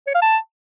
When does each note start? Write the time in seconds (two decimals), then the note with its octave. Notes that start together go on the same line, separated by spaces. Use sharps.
0.07 C#5
0.15 F5
0.22 A5